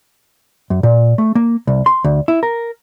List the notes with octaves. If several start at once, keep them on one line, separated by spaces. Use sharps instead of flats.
F#2
A#2
A3
A#3
C2
C6
D2
E4
A#4